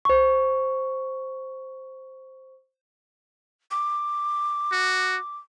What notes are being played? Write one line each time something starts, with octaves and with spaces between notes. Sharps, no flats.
C5 C#6
D6
F#4